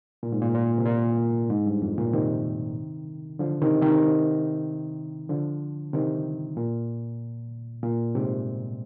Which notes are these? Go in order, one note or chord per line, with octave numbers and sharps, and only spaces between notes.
A#2
G#2
A#2
A#2
C3
A#2
G#2
G2
F2
A#2
C3 D#3
D3 F3
C3 D#3
C3 D#3
D3 F3
C3 D#3
A#2
A#2
G#2 C3